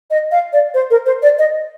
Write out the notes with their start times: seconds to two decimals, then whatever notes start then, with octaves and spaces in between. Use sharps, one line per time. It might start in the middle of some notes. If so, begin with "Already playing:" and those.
0.11 D#5
0.32 F5
0.53 D5
0.74 C5
0.91 A#4
1.06 C5
1.22 D5
1.39 D#5